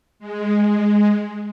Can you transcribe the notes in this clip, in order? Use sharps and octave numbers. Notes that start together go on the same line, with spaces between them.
G#3